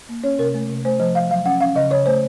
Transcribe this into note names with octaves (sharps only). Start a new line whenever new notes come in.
A#3
C#4 C#5
C3 A#4
A3
C3
A3 C5
F3 C5
F3 F5
F#3 F5
C#4 F#5
C#4 F5
C#3 D#5
C#3 C#5
A3 C5